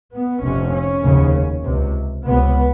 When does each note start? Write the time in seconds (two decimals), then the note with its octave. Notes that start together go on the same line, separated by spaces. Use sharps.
0.13 B3
0.42 F1 F2 C3 C#4
0.73 C#4
1.03 F1 D#2 C#3
1.64 C#2 C3
2.25 C#2 C3 B3